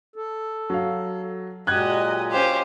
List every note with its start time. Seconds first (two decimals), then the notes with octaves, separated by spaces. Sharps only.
0.16 A4
0.70 F#3 F5
1.67 A#2 F#3 G#3 G4 D#5 F#6 G#6
2.31 C#4 F4 G4 C5